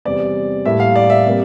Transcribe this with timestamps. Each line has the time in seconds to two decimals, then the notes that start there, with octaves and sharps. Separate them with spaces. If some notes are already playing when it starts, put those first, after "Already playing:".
0.05 E2 C3 G3 C4 D5
0.65 A2 G3 A#3 E5
0.80 F5
0.96 D5
1.10 E5
1.26 C3 G3 A#3